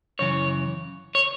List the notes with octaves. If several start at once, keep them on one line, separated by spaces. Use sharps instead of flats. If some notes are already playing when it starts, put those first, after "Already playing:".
F#2 C#3 E3 C#5
C#5